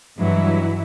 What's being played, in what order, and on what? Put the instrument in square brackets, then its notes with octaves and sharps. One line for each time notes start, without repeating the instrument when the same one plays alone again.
[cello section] G2 E3 F#3 G#3 E4